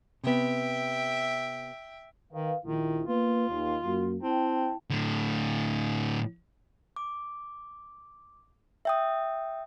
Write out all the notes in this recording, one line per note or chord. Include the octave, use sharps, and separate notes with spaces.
C3 B3 E5 G5
D#3 B4 F5
A#1 D#3 E4 F4
A#3 B3 F4 B4
D#2
F#2 A#3 F#4
C4 E4 G5 A5
A2 D3
D6
E5 G5 D#6